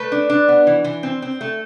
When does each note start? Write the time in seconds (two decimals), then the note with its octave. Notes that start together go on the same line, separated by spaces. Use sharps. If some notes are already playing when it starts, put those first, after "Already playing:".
Already playing: A3 B4
0.12 D4
0.30 D4
0.48 B3
0.67 E3
0.84 E3
1.03 C4
1.22 C4
1.41 A3